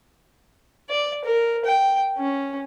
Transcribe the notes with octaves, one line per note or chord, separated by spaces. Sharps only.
D5
A#4
G5
C#4